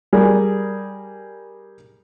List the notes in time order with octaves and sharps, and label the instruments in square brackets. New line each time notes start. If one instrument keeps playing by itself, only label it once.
[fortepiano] G3 G#4 A#4 D5